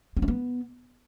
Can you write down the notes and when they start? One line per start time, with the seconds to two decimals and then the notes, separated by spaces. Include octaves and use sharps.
0.17 C4
0.22 C#4
0.28 B3